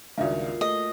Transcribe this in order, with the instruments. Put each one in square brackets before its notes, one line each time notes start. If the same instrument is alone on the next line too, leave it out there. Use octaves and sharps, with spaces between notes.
[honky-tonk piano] C#2 G2 D#3 [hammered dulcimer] A#2 G#4 [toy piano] F#4 E5 F5
[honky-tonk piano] A3 [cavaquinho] D#5